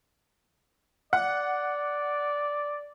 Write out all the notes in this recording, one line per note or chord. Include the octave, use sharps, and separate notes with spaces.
D5 F#5